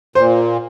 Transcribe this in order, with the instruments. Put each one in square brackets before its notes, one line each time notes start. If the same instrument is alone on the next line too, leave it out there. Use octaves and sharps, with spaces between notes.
[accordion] A#2 [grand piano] C5